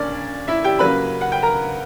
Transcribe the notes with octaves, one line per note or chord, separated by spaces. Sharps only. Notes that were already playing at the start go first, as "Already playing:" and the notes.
Already playing: A#2 A#3 C#4 D4 D5
E4 E5
G4 G5
C#3 F#3 A#3 B4 B5
F#5
G5
A#4 A#5